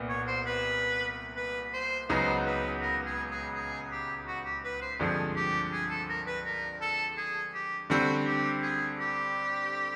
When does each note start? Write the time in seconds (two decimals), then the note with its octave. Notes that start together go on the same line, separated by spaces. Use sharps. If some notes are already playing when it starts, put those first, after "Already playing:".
Already playing: C2 A#2 B3
0.09 C#5
0.27 C5
0.46 B4
1.36 B4
1.73 C5
2.09 C#2 C#3 F#3 B3 D#4 C5
2.46 B4
2.81 A#4
3.06 G#4
3.31 G#4
3.55 G#4
3.91 G4
4.27 F#4
4.45 G4
4.64 B4
4.81 C5
5.00 G2 D3 F3 G#3 C4 G#4
5.36 G4
5.72 G#4
5.90 A4
6.09 A#4
6.27 B4
6.45 A#4
6.81 A4
7.17 G#4
7.54 G4
7.90 D3 G3 C4 F#4
8.26 G4
8.63 G#4
8.99 G4